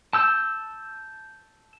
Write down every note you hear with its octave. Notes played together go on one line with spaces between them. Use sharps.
A5 E6 G6